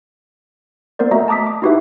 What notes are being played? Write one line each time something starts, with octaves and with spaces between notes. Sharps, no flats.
A#3 B3 A#4 C5 D5
A3 F#4 D#5 E5 A#5
A5 A#5 D6 D#6 B6
D6
D#4 E4 F#4 G4 B4 E5